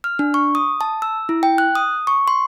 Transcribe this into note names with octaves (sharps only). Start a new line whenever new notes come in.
F6
D4
C#6
D#6
A5
E6
E4
G5
F#6
D#6
C#6
C6